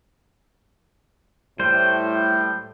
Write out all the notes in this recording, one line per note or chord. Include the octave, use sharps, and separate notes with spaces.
A2 G3 C5